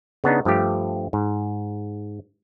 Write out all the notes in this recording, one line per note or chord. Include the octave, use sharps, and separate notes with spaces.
C#3 B3 D4 D#4
G2 F3 A3 G4
G#2